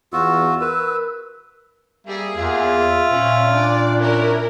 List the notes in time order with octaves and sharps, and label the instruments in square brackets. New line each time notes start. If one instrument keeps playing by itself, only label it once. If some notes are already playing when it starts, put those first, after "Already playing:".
[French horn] E2 [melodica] F4 F#4 [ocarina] E6
[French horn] A#4 [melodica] B4
[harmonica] G3 [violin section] A#3 G#4 [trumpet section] E5
[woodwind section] E2 [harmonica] F4
[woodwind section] A#2 [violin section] C#4
[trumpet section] D4 [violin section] D5
[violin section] C#4 E4 A#4